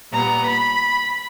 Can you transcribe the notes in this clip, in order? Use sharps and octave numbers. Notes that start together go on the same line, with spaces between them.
A#2 G3 B3 A#5
B5